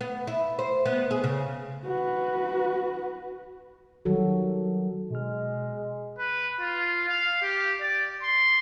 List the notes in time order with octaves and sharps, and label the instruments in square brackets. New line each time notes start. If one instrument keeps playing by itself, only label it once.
[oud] B3
E4
C5
B3
G#4
C#3
[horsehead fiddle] F#4 B4
[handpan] D#3 F#3 G3 F#4 A4
[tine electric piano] B2 F6 [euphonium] G#3
[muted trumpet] B4
F4
F5
G4
D5
C6